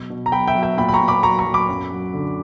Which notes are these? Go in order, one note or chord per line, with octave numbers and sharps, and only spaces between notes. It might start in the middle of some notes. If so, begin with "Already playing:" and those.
Already playing: B2 F#3 C#6
B2
A#5
F#3 G5 B5
E5 G5
F#3
E5 G5
A#2 G5 B5
B5
A#5 C#6
A#2
B5 D6
F#3 A#5 C#6
A#5 C#6
F#3
B5 D6
F#2
F#3
D3